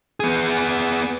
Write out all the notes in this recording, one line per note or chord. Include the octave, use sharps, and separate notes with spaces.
B3 G#4